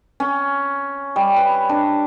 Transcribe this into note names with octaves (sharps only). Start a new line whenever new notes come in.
C#4
G3
B4
D4